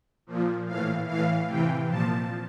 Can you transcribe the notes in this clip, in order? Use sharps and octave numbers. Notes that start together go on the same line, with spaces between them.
A#2 F3
A2 E3 F5
A2 E3 F5
C3 E3 G5
A#2 F3 A5